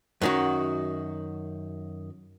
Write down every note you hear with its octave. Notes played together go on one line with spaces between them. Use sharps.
F#2 D#3 F#4